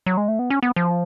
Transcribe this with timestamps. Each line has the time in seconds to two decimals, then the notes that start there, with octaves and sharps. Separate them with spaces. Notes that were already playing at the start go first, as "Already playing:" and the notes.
0.06 F#3
0.17 G#3
0.28 A3
0.39 B3
0.50 C#4
0.63 B3
0.76 F3